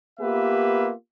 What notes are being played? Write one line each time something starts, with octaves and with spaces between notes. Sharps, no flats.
A#3 B3 F4 G4 B4 E5